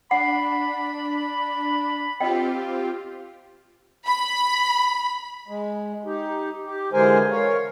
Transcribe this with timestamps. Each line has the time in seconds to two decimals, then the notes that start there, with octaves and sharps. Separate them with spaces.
0.11 D4 F#5 B5
2.20 C4 F4 G4 D#5 G5
4.07 B5
5.48 G#3
6.05 D#4 G4
6.65 G4
6.93 D3 E3 G#3 A#4 C5 G#5
7.31 A#4 C#5 F5